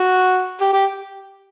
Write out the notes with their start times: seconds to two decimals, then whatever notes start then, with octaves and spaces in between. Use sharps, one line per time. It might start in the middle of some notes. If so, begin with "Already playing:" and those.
Already playing: F#4
0.60 G4
0.73 G4